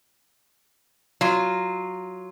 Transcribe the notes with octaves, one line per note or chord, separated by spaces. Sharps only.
F#3 F4